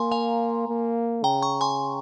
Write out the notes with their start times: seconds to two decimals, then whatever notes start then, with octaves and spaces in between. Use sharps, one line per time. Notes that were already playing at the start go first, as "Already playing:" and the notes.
Already playing: A#3 G#5 A#5 C6
0.12 F5 G#5
0.68 A#3
1.23 C#3 G5 A#5
1.42 A#5 C#6
1.61 G#5 C6